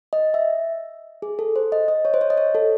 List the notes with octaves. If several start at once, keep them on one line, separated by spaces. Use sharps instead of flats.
D#5
E5
G#4
A4
C5
D#5
D#5
C#5
C5
C#5
D#5
C#5
A4